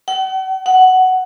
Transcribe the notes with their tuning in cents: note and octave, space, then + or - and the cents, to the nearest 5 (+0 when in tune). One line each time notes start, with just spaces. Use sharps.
F#5 +45
F#5 +10